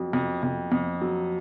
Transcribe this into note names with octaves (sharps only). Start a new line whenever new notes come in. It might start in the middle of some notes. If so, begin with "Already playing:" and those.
Already playing: F2 F#3
F2
F2
F2
F#3